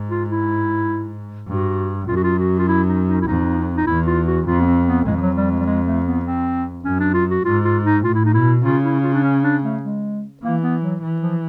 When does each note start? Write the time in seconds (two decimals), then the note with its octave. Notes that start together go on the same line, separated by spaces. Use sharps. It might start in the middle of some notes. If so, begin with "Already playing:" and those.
Already playing: G#2
0.10 F4
0.30 E4
1.48 G2 F#4
2.08 F#2 F4
2.16 F#4
2.24 F4
2.38 F#4
2.59 F4
2.68 E4
2.88 D#4
3.08 D#4
3.21 E4
3.27 F2 D#4
3.77 D#4
3.87 E2 E4
4.07 F4
4.27 F#4
4.46 F2 F4
4.61 B3
4.66 C4
4.86 B3
5.06 F2 G#3
5.17 F3
5.21 F#3
5.36 G3
5.51 G#3
5.60 G3
5.66 G#3
5.86 A3
6.06 B3
6.25 C4
6.85 F#2 C#4
7.00 D4
7.14 F4
7.30 F#4
7.45 G#2 F4
7.65 F4
7.84 D#4
8.04 A2 F4
8.14 E4
8.25 D#4
8.34 B2 E4
8.64 C#3 F4
8.84 E4
9.04 F4
9.14 D4
9.23 C#4
9.43 D4
9.63 A3
9.83 G#3
10.43 E3 A#3
10.62 B3
10.82 F#3
11.02 E3
11.22 F3